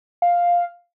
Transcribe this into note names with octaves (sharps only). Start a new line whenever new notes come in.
F5